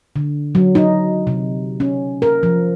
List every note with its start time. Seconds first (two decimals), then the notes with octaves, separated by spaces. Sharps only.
0.16 D3
0.55 F#3
0.75 D#4
1.27 C3
1.80 C#4
2.22 A#4
2.43 F3